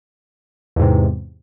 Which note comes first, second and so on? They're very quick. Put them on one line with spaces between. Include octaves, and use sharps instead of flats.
E2 G#2 C3